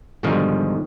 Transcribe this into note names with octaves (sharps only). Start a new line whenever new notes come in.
G#2 B2 D3 D#3 F3 G3